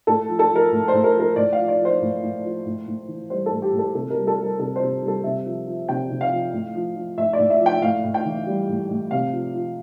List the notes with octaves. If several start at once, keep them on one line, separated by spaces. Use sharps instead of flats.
A2 A4
F3
A4
F3
A#4
A2
C5
A2
A#4
F3 A#4
A2 D5
F5
F3
D5
F3
C5
A2
A2
F3
A2
A2
E3
G3 C5
A4
A2
G4
A2
A4
C3 A4
A#4
G3
A4
G3
A#4
C3 A4
C5
C3
G3
A4
C3 E5
F3
F3
C3 G5
C3
F5
F3
A2
F3
F3
A2 E5
D5
A2
E5
F3
G5
A2 F5
A2
G5
E3
G3
A2
A2
C3 F5
F3
F3